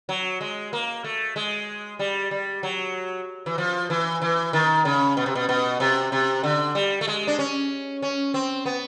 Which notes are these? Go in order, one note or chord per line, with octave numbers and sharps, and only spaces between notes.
F#3
G#3
A#3
A3
G#3
G3
G3
F#3
E3
F3
E3
E3
D#3
C#3
B2
C3
B2
B2
C3
C3
D3
G3
A3
G#3
D4
C#4
C#4
C4
B3